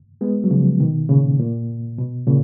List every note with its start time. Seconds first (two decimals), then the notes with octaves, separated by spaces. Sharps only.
0.21 G#3 B3
0.44 F#3
0.51 C#3 F3
0.80 B2 D#3
1.09 A#2 C#3
1.39 A#2
1.98 B2
2.27 A#2 C#3